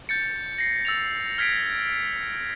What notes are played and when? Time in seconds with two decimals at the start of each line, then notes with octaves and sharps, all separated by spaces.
0.09 G6 A6 C#7
0.58 A#6 C7
0.85 E6 A6 F7
1.38 F6 G#6 B6 C7 D7